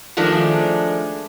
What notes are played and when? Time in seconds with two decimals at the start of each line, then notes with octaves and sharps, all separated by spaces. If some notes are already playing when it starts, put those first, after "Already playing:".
0.17 D#3 F3 G#3 A3 D4